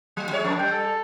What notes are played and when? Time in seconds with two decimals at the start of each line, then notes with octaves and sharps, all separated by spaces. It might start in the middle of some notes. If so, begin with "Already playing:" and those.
0.17 F#3
0.29 F#3 G#3 C#5
0.44 F2 D4 A#4
0.59 G3 G5
0.72 A4